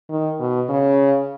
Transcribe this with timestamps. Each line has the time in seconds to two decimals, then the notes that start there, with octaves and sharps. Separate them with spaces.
0.10 D#3
0.40 B2
0.69 C#3